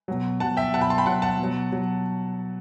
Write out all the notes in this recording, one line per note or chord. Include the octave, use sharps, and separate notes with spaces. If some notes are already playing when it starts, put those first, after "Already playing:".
B2 F#3
B2 F#3 F#5 A5
E5 G5
B2 F#3 F#5 A5
G5 B5
A5 C6
G5 B5
B2 F#3 F#5 A5
F#5 A5
B2 F#3
F#3